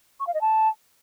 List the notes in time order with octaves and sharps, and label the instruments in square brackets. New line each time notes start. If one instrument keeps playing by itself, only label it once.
[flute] C#6
F5
D#5
A5